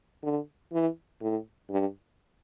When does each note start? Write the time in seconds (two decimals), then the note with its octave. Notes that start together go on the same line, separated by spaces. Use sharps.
0.23 D3
0.72 E3
1.21 A2
1.70 G2